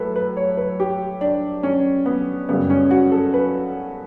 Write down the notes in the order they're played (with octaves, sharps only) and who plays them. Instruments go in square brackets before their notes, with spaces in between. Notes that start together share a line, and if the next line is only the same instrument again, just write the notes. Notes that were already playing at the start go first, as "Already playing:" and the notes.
Already playing: [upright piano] A2 F#3 A4 B4
B4
C#5
B4
G4
D4
C#4
B3
F#2 C#3 G3 B3
C#4
F#4
A4
B4